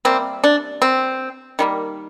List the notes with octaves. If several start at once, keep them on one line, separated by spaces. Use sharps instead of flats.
C3 G3 A#3 C4
D4
C4
D#3 G3 A#3